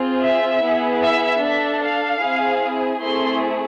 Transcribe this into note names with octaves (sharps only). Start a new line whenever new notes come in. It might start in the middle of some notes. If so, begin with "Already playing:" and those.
Already playing: C4 F4 G#4
E5
B3 E4 G#4
E5
D4 A4 E5
F5
C4 E4 G#4
A3 C4 E4 G#4 C6